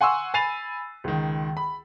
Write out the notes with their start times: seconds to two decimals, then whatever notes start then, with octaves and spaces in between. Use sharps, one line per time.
0.01 F#5 G#5 C6 C#6 E6
0.34 G#5 B5 A6 C7 D#7 F7
1.04 C#2 D#3
1.57 B5